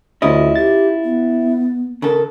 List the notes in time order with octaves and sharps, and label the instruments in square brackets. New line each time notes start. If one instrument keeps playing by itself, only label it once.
[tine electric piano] D2 D#5 [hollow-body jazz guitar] C#4 E4 F4
[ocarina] G4 [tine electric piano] A6
[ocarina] B3
[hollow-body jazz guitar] C#3 A4 [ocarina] A#4